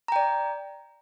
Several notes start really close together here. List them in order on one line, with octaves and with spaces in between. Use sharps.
A#5 G5 D5